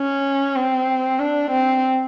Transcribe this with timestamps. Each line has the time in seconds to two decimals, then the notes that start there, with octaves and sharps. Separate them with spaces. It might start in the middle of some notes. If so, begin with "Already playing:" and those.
Already playing: C#4
0.56 C4
1.19 D4
1.51 C4